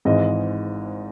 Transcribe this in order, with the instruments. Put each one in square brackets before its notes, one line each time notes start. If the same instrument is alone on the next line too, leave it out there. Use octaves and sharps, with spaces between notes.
[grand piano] G#1 G#2 E3 D#5